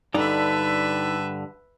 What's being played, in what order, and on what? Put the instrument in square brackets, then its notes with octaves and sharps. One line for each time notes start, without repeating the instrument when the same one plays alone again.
[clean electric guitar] G2 D3 [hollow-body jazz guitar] D#4 D5 [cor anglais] A4 [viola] B4 E5